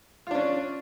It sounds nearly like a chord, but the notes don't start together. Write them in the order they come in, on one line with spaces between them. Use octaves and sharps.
F4 D4 C#4